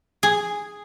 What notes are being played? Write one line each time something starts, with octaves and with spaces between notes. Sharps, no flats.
G#4